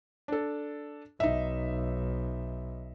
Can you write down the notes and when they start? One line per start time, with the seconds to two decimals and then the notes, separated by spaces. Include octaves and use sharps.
0.28 D4 A4
1.20 B1 D#4 E5